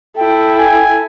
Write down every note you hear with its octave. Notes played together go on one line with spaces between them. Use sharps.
E4 A4 G5
G#5